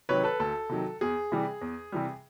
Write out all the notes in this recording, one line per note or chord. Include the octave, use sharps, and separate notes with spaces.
C3 D#3 F#3 B4 C#5
A4 B4
D2 A4
C3 D#3 F#3
E2 G#4
C3 E3 G3
E2
C3 E3 G3